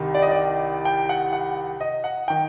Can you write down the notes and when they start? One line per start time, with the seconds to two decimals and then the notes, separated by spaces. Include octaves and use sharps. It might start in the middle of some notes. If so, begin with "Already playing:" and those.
Already playing: C2 C3 D#3
0.15 D5
0.22 D#5
0.31 D5
0.85 G5
1.09 F#5
1.33 F#5
1.81 D#5
2.04 F#5
2.28 D#3 G5